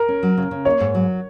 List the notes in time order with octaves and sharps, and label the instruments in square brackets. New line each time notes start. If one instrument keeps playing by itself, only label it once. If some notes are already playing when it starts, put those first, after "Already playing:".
Already playing: [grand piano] A#4
[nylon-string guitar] C#4
F#3
C#3
C#3
[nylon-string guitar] A#3 [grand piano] C#5
[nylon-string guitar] G#2
F#3